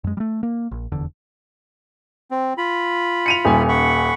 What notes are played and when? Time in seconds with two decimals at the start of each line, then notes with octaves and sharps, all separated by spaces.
0.04 F#2 G#3
0.17 G3 A3
0.43 A#3
0.71 A#1
0.92 F1 E2 D3
2.31 C4
2.58 F4 B5
3.26 C#7 D#7 F7
3.45 D#1 G#5
3.69 F#5 B5 C#6